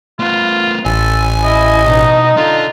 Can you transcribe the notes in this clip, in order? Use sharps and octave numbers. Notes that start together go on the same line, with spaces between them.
A3 B3 F4
A1 A4 G#5
E4 D#5
B2 D#4
D4 F4 A4